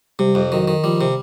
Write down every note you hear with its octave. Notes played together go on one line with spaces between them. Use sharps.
C3 G3
F2
D#3 F#3
D#3
F3 G3
C3